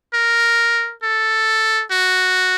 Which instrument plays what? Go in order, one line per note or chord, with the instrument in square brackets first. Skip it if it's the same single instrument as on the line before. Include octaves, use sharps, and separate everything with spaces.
[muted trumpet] A#4
A4
F#4